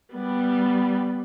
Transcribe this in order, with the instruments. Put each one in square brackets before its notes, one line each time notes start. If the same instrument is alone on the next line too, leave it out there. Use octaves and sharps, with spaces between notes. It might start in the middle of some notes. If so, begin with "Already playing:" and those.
[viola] G3 B3